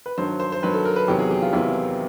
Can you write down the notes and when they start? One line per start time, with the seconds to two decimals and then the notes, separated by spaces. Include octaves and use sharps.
0.06 B4
0.18 G2 D#3 F#3 C5
0.40 C5
0.52 C5
0.62 G2 D#3 F#3 B4
0.73 A4
0.85 A#4
0.96 B4
1.08 E2 C3 D#3 F#3 G4
1.19 G#4
1.31 G4
1.42 F4
1.53 E2 C3 D#3 F#3 E4